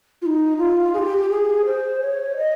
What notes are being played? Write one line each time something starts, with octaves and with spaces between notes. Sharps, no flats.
F4
D#4
F4
G#4
G4
G#4
C5
C#5
D#5